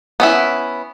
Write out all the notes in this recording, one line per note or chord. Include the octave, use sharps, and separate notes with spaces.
B3 C#4 E4